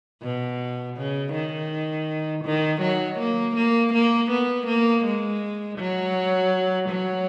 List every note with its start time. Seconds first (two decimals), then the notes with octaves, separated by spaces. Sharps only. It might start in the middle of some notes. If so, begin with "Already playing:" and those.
0.22 B2
0.98 C#3
1.33 D#3
2.45 D#3
2.82 F#3
3.20 A#3
3.56 A#3
3.94 A#3
4.31 B3
4.67 A#3
5.05 G#3
5.79 F#3
6.89 F#3